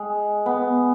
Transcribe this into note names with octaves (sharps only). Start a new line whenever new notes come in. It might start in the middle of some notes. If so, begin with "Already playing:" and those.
Already playing: G#3
B3